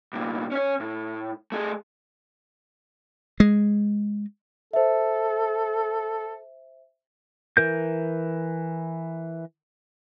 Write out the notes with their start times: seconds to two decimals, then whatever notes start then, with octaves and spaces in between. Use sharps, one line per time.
0.13 C2 A#2
0.51 C#4 C#5
0.80 A2
1.52 A3 G#4
3.40 G#3
4.73 A4 C5 E5
7.57 E3 A#4 G6